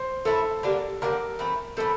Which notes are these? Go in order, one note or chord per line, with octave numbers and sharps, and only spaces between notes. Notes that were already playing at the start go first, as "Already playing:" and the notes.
Already playing: C5
E3 A3 E4 A4
D3 G3 A#3 D4
D3 G3 A#3 D4 A#4
E3 A3 C4
E3 A3 C4 A4